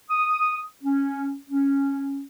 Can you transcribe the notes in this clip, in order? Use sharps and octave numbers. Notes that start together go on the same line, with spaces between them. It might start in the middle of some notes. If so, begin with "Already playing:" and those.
D#6
C#4
C#4